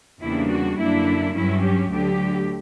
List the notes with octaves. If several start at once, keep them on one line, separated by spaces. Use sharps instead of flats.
E2 C#3 G3 A#3 D4 E4
F#4
F#2 D3 A#3 D4 E4
G2 F#3 C#4 E4
G4
D2 D3 F#3 G4